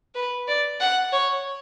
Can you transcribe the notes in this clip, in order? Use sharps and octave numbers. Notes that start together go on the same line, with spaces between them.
B4
D5
F#5
C#5